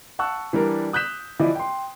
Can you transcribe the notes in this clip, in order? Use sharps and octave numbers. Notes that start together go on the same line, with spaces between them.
F#5 A5 C#6 E6 F#6
E3 G3 D4 A#4
D#6 F#6 G6 B6 E7
E3 F3 E4 D5 D#5
G5 C6